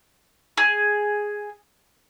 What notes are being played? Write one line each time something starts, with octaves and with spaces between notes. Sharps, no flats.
G#4